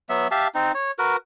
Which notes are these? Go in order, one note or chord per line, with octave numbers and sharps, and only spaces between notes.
F#3 B3 E5
G4 E5 F5 A5
C4 D#4
C#5
F#4 A#4 B4